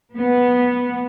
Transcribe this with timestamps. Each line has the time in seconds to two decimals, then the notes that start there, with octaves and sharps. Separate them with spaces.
0.15 B3